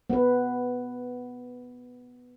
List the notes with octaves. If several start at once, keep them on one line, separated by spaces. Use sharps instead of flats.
B3 B4